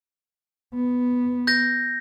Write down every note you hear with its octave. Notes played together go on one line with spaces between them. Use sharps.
B3
G6 A#6